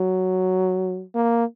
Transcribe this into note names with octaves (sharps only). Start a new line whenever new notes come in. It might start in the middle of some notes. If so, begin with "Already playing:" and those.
Already playing: F#3
A#3